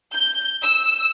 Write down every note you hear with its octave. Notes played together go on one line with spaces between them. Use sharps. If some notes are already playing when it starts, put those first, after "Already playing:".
G6
E6